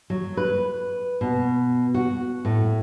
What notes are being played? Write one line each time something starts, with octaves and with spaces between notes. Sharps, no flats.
F#3
B4
B2
F#4
A2